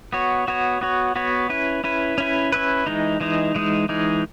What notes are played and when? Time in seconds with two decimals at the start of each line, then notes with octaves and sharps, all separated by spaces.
0.13 B3 F#4 C#5
0.48 B3 F#4 C#5
0.81 B3 F#4 C#5
1.16 B3 F#4 C#5
1.50 C#4 E4 B4
1.84 C#4 E4 B4
2.18 C#4 E4 B4
2.52 C#4 E4 B4
2.87 E3 G#3 D#4
3.20 E3 G#3 D#4
3.55 E3 G#3 D#4
3.89 E3 G#3 D#4